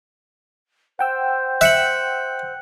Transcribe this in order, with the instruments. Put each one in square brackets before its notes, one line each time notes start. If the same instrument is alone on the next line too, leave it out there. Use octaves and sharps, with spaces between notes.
[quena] C5 [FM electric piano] F#5 G5 E6
[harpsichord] E5 [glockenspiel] F#6 C#7 F#7